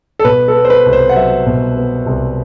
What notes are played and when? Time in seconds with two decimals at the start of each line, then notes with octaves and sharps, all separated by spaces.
0.19 A4
0.25 B2 B4
0.48 A4
0.55 B3
0.65 C5
0.70 B4
0.86 C2
0.93 C5
1.09 F#5
1.16 F#3 E5
1.46 B2
1.77 B3
2.06 C2